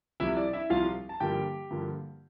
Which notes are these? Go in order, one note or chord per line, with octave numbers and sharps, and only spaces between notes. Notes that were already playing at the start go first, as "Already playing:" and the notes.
C2 C3 F3 E4 E5
D5
E4 E5
C2 C3 F3 F4 F5
A5
G2 D3 F3 A#3 G4 G5
G2 D3 F3 A#3